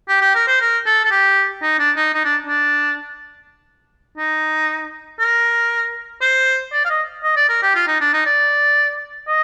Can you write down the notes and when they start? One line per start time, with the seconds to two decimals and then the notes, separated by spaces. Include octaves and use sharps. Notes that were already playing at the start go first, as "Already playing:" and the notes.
0.09 G4
0.21 G4
0.35 A#4
0.48 C5
0.61 A#4
0.86 A4
1.04 A4
1.11 G4
1.62 D#4
1.79 D4
1.97 D#4
2.13 D#4
2.25 D4
2.47 D4
4.18 D#4
5.20 A#4
6.21 C5
6.72 D5
6.85 F5
6.90 D#5
7.23 D#5
7.36 D5
7.49 A#4
7.62 G4
7.75 F4
7.87 D#4
8.01 D4
8.13 D#4
8.26 D5
9.28 D#5